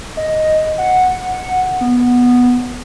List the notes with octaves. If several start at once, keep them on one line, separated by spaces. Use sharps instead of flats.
D#5
F#5
B3